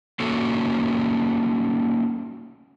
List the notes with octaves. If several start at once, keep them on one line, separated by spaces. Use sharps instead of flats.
A3 A#3 C#4 D#4 F#4 A4